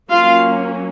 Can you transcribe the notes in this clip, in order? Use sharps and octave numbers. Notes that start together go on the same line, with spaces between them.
F#3 A#3 C#4 F4 F5